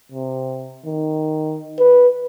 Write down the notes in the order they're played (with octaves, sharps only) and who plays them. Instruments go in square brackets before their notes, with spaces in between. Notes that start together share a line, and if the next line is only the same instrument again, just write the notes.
[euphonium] C3
D#3
B4